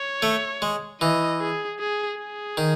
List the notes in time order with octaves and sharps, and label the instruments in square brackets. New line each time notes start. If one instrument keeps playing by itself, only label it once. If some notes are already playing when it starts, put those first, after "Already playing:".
Already playing: [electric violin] C#5
[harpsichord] A3
G#3
[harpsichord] E3 [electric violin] D#5
[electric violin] G#4
G#4
G#4
[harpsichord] D#3